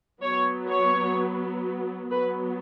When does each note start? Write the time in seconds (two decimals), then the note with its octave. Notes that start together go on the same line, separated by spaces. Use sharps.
0.21 F#3 B3 C#5
0.69 C#5
2.11 F#3 B3 B4